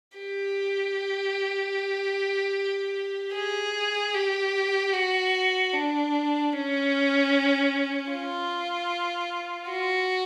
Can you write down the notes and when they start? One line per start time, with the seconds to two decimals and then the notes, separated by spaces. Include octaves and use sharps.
0.18 G4
3.35 G#4
4.14 G4
4.93 F#4
5.73 D4
6.53 C#4
8.12 F4
9.70 F#4